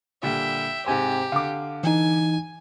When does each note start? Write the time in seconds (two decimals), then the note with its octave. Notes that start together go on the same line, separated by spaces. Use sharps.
0.23 A#2 D3 G3 E5 G5
0.86 G#2 C3 G4 C5 G5 G#5
1.32 D3 F5 D6
1.84 E3 D#4 G#5